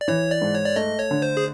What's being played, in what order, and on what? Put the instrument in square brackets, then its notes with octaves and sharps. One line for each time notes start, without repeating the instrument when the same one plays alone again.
[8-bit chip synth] D5
[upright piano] E3 [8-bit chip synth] C#5
[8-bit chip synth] D5
[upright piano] G#2
[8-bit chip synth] C#5
D5
[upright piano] A3 [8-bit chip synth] D#5
[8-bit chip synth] C#5
[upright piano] D3
[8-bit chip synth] C5
G#4